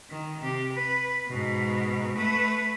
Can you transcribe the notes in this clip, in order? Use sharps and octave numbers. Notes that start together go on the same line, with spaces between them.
D#3
C3 G4
B4
G#2 B2
A3 B4